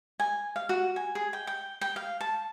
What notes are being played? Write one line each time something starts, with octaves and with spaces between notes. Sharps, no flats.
G#5
F5
F#4
G#5
G#4
G5
G5
G5
F5
A5